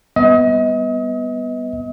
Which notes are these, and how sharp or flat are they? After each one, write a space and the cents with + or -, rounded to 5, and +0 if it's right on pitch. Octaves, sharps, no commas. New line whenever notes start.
G3 +15 B3 +0 D#5 +35